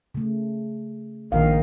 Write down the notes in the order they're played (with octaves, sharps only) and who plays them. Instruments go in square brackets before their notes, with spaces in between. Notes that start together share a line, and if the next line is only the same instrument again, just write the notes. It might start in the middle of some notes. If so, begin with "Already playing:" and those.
[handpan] C#3 A3
[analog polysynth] A#1 [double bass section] D#3 [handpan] F5